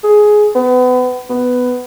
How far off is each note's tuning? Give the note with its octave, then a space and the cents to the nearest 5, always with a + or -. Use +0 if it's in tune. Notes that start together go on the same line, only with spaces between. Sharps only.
G#4 +10
B3 +30
B3 +10